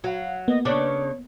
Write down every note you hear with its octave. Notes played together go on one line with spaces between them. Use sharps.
F#3 F#4 F5 F#5
A#3 B3 D#5
C#3 D4 C#5